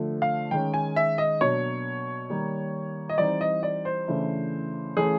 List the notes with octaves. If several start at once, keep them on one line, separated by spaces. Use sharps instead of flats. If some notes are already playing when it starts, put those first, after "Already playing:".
Already playing: D3 F3 A3 D4
F5
D#3 G#3 C#4 G5
G#5
E5
D#5
B2 F#3 A#3 D4 C#5
D#3 G3 A#3
D#5
E3 G3 C4 D#4 D5
D#5
D5
C5
C#3 E3 A3 D4
E3 A3 C#4 G#4